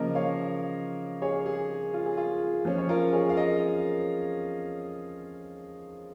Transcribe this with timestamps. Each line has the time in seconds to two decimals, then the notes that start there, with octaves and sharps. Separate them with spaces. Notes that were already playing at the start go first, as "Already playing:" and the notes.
Already playing: C#3 F3 A#3 A#4 D#5
0.15 C#5 F5
1.22 G#4 C#5
1.46 G#4
1.94 F4
2.06 G#4
2.17 F4
2.65 F3 C#4 G#4
2.78 C#5
2.89 F4 A#4
3.13 G#4 C#5
3.29 F5
3.37 A#4 D#5